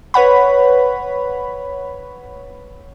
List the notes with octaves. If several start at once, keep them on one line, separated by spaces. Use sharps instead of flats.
B4 C#5 F#5 B5